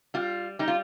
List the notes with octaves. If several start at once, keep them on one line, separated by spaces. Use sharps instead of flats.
G3 F4
G3 D#4
F4